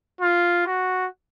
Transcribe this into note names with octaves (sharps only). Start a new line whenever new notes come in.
F4
F#4